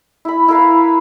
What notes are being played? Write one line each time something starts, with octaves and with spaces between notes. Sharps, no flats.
E4 B5
E4 A#4 B4 F5